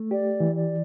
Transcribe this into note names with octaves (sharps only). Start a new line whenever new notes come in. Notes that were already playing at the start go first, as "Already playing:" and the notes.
Already playing: A3
G4 D5
E3
D5